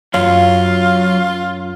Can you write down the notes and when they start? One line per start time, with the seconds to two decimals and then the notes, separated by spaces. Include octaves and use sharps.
0.14 F#2 F#3 F4 C#5 F5